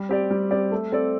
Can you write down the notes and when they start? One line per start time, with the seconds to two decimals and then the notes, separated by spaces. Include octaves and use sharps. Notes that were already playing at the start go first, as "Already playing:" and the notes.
Already playing: G3
0.09 C4 G4 D5
0.30 G3
0.51 C4 G4 D5
0.72 A3
0.92 C4 A4 D5